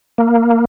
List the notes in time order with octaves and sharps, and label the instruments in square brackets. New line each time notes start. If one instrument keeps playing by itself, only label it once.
[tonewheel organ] A#3